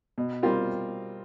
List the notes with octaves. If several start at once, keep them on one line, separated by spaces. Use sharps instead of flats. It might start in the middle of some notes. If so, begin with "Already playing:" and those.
B2
G3 C4 F4 A#4